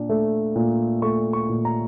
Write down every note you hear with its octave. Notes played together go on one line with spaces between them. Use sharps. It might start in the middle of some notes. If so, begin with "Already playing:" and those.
Already playing: A#2 D4
A3
A#2
A3 C#6
C#6
A#2
A#5